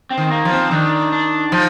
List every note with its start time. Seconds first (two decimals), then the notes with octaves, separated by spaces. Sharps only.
0.11 C4
0.18 D#3
0.31 A#3
0.45 F3
0.51 C4
0.71 D#3 D4
1.12 D4
1.52 F3 D#4